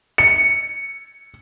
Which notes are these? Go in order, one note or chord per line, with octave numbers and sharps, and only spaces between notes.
C#7